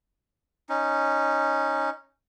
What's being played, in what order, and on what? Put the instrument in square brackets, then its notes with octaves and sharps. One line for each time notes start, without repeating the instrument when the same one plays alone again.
[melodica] C#4 D#4